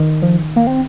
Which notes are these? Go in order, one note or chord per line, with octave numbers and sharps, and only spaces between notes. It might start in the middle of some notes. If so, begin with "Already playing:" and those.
Already playing: D#3
F3
A#3
C4